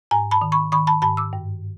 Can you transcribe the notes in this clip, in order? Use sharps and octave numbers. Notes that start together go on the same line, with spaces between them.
G#2 G#5 A#5
A5 B5
D#3
B5 C#6
D#3 B5 C#6
A5 B5
G#2 A5 B5
D6 E6
G2